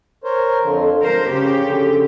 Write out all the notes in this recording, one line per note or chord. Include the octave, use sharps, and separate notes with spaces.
A#4 C5 C#5
F2 D3 F3
F3 A#4 C5
C#3 G4
D3